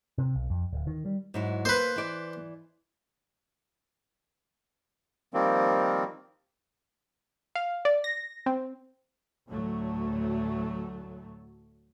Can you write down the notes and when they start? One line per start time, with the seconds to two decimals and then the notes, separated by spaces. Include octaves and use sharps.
0.18 C3
0.35 B1
0.50 F2
0.73 D1
0.87 D#3
1.05 G3
1.34 G#2 F#3 E4
1.65 A#3 B4 C5
1.96 E3 D5
5.34 D#3 F3 G3 A#3 C4
7.55 F5
7.85 D5
8.04 A#6
8.46 C4
9.47 D2 A2 F#3 A3